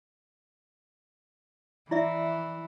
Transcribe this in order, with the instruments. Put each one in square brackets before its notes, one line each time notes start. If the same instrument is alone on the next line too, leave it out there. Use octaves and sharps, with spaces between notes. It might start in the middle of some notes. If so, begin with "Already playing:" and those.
[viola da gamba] E3 [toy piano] E4 D5 E5